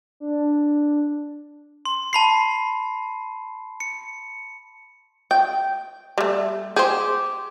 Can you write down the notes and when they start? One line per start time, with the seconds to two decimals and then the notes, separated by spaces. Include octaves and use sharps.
0.20 D4
1.85 C6
2.13 A5 B5 C7
3.80 C#7
5.31 G5
6.18 G3 A3
6.76 G4 G#4 C5